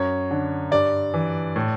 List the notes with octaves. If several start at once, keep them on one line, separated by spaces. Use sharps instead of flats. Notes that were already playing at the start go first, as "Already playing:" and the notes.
Already playing: F#2 C#5
D3
G2 D5
E3
A2